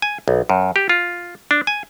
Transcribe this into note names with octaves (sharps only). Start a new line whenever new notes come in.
G#5
B1
F#2
G4
F4
D4
G#5